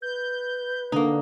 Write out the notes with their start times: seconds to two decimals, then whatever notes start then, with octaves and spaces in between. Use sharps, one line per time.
0.02 B4 G6
0.92 D3 A#3 D#4